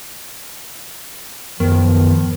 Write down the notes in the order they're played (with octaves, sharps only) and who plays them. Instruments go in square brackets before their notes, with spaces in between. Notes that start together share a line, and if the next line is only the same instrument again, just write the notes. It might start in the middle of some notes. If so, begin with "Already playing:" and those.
[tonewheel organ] F#2 B3 [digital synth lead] D#3 [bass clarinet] F3